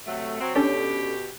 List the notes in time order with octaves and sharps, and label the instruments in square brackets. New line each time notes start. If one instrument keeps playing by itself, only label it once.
[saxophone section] C3 F#3 A3
F#3 C4
[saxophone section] B2 G4 [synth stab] C#4 D4 A4